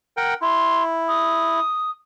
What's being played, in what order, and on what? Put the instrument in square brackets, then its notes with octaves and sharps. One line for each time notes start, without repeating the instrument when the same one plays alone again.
[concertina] A#4 F#5 G5
[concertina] E4 [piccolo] C6
[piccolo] D#6